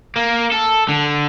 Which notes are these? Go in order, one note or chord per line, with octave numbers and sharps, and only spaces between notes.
A#3
A4
D3